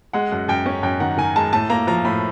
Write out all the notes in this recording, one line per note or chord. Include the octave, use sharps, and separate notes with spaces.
G#3 F#5
F#2
F#2 G5
C#4
F#2 G5
D#3 F#5
D#3 G#5
G#3 A5
A2 A5
A#3 A#5
F3 A#5
A2 B5